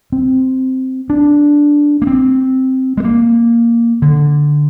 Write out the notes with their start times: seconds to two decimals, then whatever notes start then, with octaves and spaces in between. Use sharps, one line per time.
0.12 C4
1.10 D4
2.02 A#3
2.07 C4
2.97 G#3
3.04 A#3
4.02 D3